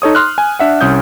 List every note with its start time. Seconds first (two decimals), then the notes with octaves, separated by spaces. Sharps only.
0.02 D#4 A4 C#5 D#6
0.15 C6 F6 F#6
0.38 G#5
0.59 D4 E5 F#5
0.81 C2 C#4 D#6 G6